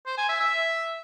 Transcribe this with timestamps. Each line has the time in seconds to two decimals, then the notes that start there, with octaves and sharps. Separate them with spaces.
0.06 C5
0.18 G#5
0.29 E5
0.41 E5